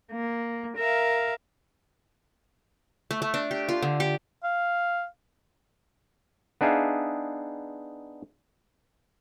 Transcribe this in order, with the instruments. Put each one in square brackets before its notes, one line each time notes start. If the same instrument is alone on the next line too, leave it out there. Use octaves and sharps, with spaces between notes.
[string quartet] A#3
A#4 E5 F5
[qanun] A3
A3
D4
G4
F4
D3
G4
[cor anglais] F5
[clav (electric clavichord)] B3 D4 D#4 G#4 E5 F5